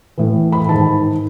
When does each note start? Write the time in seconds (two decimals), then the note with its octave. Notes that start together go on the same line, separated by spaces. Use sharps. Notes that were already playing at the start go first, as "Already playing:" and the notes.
0.18 A2 E3
0.52 B5
0.69 G#2 D#3 A5